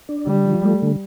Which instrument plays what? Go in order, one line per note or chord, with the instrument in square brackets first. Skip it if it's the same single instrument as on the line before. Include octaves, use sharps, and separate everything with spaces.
[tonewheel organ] D4
[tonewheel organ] D3 [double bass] G3
[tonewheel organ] F3
A3
D3